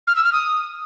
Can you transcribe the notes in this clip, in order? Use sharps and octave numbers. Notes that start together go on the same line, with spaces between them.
F6
E6
F6
D#6